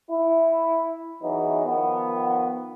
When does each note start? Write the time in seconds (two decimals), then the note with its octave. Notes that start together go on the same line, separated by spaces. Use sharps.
0.11 E4
1.23 E2 E3 F#3 D#4
1.66 D#3 F3 B3